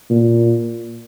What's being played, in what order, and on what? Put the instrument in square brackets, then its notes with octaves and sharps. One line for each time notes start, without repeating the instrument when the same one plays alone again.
[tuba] A#2